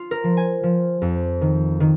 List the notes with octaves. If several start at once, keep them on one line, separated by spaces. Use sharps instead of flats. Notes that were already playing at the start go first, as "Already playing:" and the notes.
Already playing: F4
A#4
F3
G#5
F3
F2
D#3
D#3